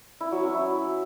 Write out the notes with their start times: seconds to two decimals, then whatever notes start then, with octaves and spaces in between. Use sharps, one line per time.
0.20 E4
0.32 F#3
0.43 C#4
0.55 E4